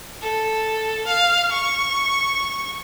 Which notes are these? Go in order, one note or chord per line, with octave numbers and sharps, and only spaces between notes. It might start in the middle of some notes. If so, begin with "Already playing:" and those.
A4
F5
C#6